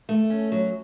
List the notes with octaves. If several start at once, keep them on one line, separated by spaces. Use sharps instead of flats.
A3
C#4
F#3